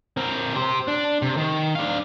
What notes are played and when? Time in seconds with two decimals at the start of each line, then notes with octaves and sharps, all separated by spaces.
0.17 C4 A#4
0.56 G4 C5
0.88 D4
1.22 C3
1.37 D#3
1.75 D4 F5